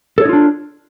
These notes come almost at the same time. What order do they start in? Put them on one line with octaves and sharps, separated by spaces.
A4 C#5 D#4 F4 D4